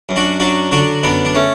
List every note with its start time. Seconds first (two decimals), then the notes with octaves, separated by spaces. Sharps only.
0.09 F#2
0.16 D4 F#4
0.40 F#3 D4 F#4
0.71 D3 D4 F#4
1.03 F#2 B3 D4
1.25 D4
1.35 A3 C#4